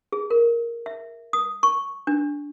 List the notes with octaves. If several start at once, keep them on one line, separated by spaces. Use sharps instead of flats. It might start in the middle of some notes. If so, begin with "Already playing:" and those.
G#4
A#4
E5
D#6
C#6
D4